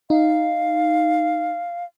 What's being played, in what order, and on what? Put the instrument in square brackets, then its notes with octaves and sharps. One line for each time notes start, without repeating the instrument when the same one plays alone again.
[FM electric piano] D#4 [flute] F5